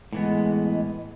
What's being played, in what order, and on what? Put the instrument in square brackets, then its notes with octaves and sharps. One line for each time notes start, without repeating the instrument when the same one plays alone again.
[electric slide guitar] A2 E3 B3 [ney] G#3